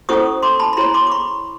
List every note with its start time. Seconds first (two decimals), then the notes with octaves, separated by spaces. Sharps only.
0.09 C#4 E4 A4 C5 C#6 D#6
0.42 C6 D6
0.60 A5 B5
0.73 B5
0.77 E4 G#4 C#5 A#5 C6
0.94 C6 D6
1.07 D6
1.11 B5 C#6